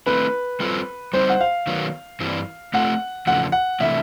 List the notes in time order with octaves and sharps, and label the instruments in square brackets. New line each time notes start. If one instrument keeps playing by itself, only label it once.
[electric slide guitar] A3 C4 E4 [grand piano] B4
[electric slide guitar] G3 C4 F4 A4 C5
[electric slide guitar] G3 C4 D#4 [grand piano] C5
[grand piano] F#5
F5
[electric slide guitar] D#3 F#3 B3
G2 E3 G3 C4
[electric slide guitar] A3 C4 F4 A4 [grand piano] F#5
[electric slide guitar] E2 C#3 F3 A3 [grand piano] F#5
[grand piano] F#5
[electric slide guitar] C3 E3 A3 [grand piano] E5